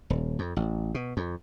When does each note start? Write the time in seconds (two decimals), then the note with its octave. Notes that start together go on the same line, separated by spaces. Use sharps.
0.10 D#1
0.39 F2
0.56 A1
0.95 B2
1.17 F2